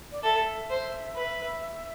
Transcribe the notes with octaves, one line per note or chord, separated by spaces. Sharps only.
D5
A4 E5
C5
B4